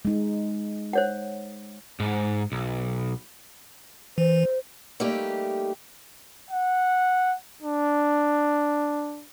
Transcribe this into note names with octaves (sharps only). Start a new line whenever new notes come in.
G#3 D#4
C5 C#5 F#5
G#2
B1
E3 C5
G3 A3 A#3 D#4 G4
F#5
D4